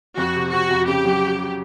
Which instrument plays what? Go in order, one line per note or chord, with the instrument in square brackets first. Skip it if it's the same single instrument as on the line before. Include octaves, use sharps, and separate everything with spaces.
[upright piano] F2 [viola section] F#4
[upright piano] C3
[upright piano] C3 [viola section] F#4
[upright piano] F2
[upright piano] C#3 [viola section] G4
[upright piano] F#3